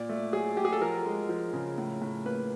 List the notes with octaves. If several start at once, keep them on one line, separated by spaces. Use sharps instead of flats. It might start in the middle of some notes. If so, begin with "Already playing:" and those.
Already playing: A#2 D5
A3
F#3 G#4
F#3 G4
G#4
A4
F3 A#4
G#3
F3
C#3
A2
A2
A#3 B4